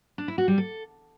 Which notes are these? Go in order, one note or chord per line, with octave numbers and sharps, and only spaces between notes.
D4
E4
F#4
G3
A4